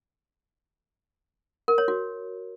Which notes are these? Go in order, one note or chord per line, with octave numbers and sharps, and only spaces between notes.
A#4
C#5
F#4